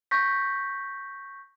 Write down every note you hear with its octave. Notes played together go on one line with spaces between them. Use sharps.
C#6 G6 A#6 B6